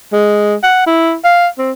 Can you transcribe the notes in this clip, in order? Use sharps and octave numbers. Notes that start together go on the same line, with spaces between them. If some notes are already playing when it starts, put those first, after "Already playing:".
G#3
F#5
E4
F5
C4